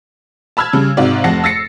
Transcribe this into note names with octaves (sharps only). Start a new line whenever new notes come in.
A5 B5 E6 F6 G#6
C#3 G3
G#2 C3 F#4 D5 F5
F1 F2 F#5 A5 A#6 C7
E6 A6 A#6 C7 C#7